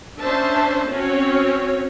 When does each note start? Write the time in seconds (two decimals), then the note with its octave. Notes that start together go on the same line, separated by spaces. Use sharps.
0.19 C#4 D4 C5 E5 A5
0.90 C4 C#4 F#4 C#5